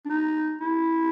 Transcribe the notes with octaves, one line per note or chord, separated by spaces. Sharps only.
D4
D#4
E4